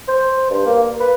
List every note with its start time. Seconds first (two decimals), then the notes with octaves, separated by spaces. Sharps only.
0.08 C5
0.50 G2
0.65 A#3
1.00 B4